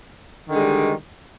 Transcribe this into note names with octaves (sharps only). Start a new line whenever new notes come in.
D3 D#3 G3 G#3